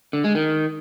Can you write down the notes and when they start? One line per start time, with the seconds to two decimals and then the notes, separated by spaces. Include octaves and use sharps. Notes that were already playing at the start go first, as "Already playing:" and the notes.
0.13 D3
0.24 G#3
0.35 D#3